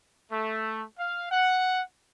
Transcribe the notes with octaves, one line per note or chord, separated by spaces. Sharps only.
A3
F5
F#5